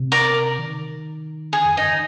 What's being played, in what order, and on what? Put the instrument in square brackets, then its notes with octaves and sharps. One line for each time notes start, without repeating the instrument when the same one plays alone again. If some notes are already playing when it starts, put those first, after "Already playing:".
Already playing: [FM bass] C3
[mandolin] A#4 D5
[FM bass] D#3
[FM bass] D3 [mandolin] G#4
[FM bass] F2
[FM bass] G2 [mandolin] D#4
[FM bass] D#3